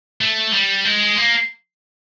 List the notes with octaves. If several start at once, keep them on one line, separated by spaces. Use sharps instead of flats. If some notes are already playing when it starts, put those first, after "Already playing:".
A3
G3
G#3
A#3